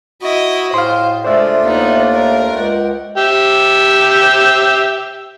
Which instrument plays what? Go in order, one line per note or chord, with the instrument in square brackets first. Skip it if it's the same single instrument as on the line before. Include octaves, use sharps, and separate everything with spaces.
[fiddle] E4 D#5 [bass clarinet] F#4
[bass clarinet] A2 [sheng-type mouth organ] G#4 D#5 [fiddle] C5 [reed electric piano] F5 C6
[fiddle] G#3 [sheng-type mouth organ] A3 D4 F4 [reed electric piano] C5 D5 E5
[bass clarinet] D#2 [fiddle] B3 D#4
[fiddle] A#4
[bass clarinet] C#2 [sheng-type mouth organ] F#5 G5
[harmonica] G4 E5